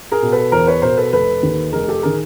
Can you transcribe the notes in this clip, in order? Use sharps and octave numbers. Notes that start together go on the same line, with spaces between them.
G#4 A#4
B2
A4 B4
E2 A#4 C5
B4 C#5
B2 A#4 C5
A4 B4
F1 A4 B4
D#2 D#3
F1 G#4 A#4
G4 A4
D#3 G#4 A#4